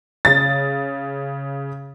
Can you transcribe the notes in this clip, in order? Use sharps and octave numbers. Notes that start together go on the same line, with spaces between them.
C#3 A6